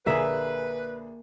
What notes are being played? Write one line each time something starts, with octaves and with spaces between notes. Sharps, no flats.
A#1 D3 A#3 G#4 B4 E5